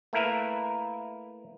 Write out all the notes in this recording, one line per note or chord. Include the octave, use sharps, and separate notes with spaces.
A3 A#3 E4 A#4 B4 E5